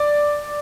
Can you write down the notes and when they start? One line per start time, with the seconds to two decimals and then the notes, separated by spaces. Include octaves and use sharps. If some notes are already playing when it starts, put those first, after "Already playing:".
Already playing: D5